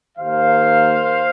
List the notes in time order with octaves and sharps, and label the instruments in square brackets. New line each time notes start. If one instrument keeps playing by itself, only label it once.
[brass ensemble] D#2 D#3 A#3 C5 F5